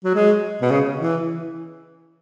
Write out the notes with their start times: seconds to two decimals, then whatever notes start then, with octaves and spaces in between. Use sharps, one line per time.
0.04 F#3
0.15 G#3
0.62 B2
0.71 C#3
1.00 E3